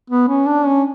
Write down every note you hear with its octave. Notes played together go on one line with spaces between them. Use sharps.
B3
C#4
D4
C#4